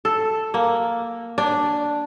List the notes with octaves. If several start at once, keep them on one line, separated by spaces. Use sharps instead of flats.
A4
A#3
D4